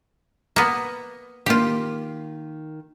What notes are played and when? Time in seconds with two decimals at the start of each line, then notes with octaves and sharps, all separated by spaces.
0.56 A#3 B3
1.46 D#3 A#3 F4 G4